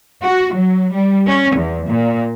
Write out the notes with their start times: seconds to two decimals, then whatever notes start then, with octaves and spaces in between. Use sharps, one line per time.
0.22 F#4
0.53 F#3
0.93 G3
1.27 C#4
1.55 E2
1.87 A#2